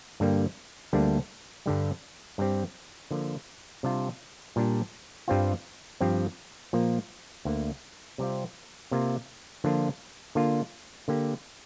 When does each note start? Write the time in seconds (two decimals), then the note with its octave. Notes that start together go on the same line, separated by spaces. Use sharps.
0.20 G2 D3 G3 A#3
0.93 D2 D3 G3 A#3 D4
1.66 G2 D3 G3
2.38 G2 G3 C4 G4
3.11 D3 F3 A#3
3.83 C3 G3 D4 F4
4.56 A#2 G3 D4 G4
5.28 G2 G3 C4 F4
6.01 G2 F3 C4 G4
6.73 A#2 F3 A#3
7.45 D2 D3 A#3
8.18 C3 G3 C4 F4
8.91 C3 A#3 F4
9.64 D3 F3 A#3 D4 F4
10.35 D3 A#3 D4 F4
11.08 D3 A#3 G4